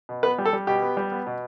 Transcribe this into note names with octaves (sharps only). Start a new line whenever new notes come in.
B2
B3 B4
G3
A4
G3
B2 G4
B3
G3
B3
B2